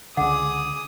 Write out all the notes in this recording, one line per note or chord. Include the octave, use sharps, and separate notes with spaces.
C#2 D3 G#4 F#5 D6 D#6